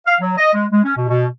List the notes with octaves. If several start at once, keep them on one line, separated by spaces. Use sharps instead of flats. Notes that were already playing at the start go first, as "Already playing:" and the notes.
F5
F#3
D#5
G#3
G#3
C#4
B2
B2